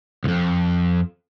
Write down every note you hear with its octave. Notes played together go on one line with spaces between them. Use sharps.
C2 F2